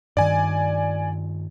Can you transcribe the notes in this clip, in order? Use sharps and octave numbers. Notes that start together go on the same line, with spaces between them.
G2 D#3 D5 G#5